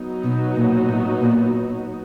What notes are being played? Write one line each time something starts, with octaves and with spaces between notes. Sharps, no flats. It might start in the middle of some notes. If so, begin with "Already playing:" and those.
Already playing: F#3 B3 D#4 F#4
B2
A#2
A2
A#2